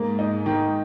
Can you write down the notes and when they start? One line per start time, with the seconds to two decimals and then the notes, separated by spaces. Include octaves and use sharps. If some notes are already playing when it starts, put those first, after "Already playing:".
Already playing: G#2 A#3
0.19 D#4
0.46 D#3